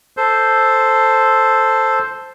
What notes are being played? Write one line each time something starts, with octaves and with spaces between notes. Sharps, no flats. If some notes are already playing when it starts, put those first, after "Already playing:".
A4 C5